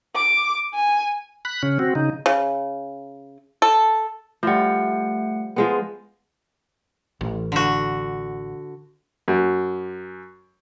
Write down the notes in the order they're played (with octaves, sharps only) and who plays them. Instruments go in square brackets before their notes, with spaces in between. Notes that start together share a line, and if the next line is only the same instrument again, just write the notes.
[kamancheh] D6
G#5
[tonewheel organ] B5 F#6
C#3 C#4
C4 F#4
C#3 D#4
[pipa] C#3
A4
[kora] F3 G3 [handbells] A3 F#5
[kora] F3 G#3 B3
[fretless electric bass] A1
[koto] D3 F#4
[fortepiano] F#2